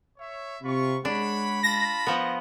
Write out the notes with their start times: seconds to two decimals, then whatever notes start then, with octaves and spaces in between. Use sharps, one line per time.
0.18 C#5 E5
0.63 C3 F4 B5 C#6
1.05 G#3 D4 C#5 F#5 B5
1.63 F4 A5 B5 A#6
2.06 F3 B3